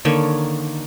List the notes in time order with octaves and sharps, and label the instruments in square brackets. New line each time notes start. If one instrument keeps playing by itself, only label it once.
[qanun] D3 D#3 A#3 C#5